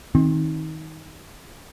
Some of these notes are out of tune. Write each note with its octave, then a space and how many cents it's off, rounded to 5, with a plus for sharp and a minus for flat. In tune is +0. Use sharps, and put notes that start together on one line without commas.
D#3 +25 C4 +30